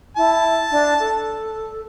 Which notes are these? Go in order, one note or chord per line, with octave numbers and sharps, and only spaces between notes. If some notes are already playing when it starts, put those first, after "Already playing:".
E4 A5
D4
A4